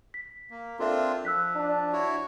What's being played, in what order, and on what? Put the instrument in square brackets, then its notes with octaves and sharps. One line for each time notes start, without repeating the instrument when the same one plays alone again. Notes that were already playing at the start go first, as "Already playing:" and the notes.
[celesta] B6
[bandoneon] A#3
[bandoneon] C4 D4 F4 [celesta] A4 A#4 E5
[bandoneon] F3 [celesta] E6 F#6 B6
[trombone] D4
[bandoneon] E4 F#4 C#5